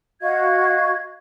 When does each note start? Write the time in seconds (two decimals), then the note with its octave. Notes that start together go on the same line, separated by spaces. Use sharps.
0.21 F#4 D#5 F5 G#6